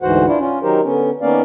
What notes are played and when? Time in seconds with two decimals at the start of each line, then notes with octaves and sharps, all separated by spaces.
0.02 D2 G#2 E3 F#4 C5 F#5
0.27 D4 E4 F4
0.39 C#4 F4
0.63 D#3 F#3 D#4 G4 A#4 C5
0.84 D3 B3 C#4
1.22 D#3 A#3 B3 C#4 D5 F5